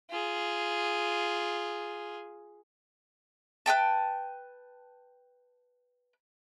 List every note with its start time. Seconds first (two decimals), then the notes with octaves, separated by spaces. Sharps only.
0.11 F4 G#4
3.66 B4 D#5 G5 A5